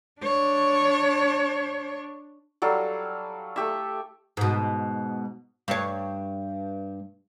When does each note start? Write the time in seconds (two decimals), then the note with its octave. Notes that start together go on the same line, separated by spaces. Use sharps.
0.21 D4 C#5
2.62 F#3 G3 A4 F5
3.56 A3 G4 E5
4.37 G#2 B2
5.68 G2 C#5